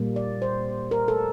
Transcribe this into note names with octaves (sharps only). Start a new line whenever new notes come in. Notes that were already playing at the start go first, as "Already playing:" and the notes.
Already playing: A#2 G3 A#3
D5
C5
A#4
A4